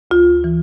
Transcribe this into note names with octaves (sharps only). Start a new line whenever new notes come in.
D2 F4
E3